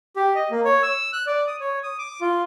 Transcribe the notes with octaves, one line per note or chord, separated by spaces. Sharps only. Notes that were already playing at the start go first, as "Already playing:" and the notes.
G4
D#5
A#3
C#5
E6
F#6
D5
D#6
C#5
D#6
D6
F4